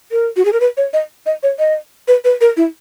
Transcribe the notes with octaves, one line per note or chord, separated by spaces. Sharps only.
A#4
F#4
G#4
A#4
B4
C#5
D#5
D#5
C#5
D#5
B4
B4
A#4
E4